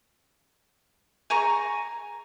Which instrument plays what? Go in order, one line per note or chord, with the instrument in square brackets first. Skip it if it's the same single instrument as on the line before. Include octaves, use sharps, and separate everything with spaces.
[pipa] G#4 G#5 A#5 C#6